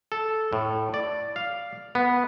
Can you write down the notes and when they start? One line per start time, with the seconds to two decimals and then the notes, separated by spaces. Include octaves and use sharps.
0.12 A4
0.53 A2
0.94 D5
1.36 F5
1.95 B3